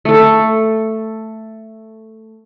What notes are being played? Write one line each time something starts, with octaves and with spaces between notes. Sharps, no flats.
A3 A4